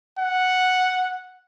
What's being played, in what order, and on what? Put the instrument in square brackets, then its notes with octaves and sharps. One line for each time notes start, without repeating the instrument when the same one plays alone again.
[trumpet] F#5